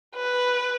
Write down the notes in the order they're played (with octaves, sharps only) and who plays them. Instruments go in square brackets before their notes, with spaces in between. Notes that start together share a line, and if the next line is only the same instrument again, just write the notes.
[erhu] B4